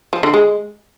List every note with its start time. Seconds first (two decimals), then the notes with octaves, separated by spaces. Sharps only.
0.13 F3
0.23 D3
0.34 G#3